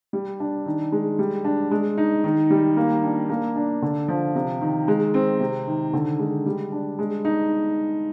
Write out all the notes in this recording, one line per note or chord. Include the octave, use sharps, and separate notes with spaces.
G3
D4
D#3
G#3
G3
D4
G#3
D#4
D#3
G3
A#3
D4
A#3
D4
D3
F3
C3
D#3
G#3
C4
C3
D#3
D3
G#3
G3
D4
G#3
D#4